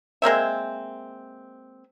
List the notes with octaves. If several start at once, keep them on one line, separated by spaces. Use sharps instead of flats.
G#3 A#3 C4 E5